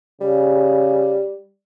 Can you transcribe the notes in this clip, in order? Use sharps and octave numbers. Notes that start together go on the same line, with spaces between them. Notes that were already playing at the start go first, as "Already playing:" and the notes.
C#3 G3